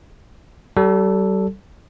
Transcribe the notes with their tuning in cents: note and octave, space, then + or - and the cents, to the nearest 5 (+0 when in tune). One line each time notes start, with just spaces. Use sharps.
G3 -35 A4 +0